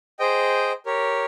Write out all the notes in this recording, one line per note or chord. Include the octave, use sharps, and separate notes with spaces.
G#4 C5 D#5 G5
G4 A#4 C#5